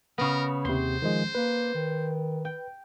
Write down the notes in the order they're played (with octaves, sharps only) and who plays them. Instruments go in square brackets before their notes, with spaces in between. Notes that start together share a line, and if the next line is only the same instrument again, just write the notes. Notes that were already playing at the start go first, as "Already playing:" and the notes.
[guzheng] C#3 B3 [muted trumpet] A#4
[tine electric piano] D#2 C3 [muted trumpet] C5 [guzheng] C6
[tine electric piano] D#3 F3 G#3
[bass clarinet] A#3 [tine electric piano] B4
[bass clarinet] D#3
[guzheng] G5